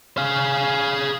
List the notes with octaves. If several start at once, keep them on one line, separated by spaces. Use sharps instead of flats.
G#4 F5